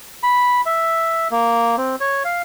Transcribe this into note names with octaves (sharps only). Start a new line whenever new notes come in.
B5
E5
A#3
C4
C#5
F5